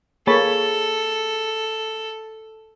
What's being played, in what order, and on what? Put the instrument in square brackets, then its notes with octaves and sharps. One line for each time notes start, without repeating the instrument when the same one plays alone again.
[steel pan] A#3 C#5 B5 [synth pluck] G#4 A6 [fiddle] A4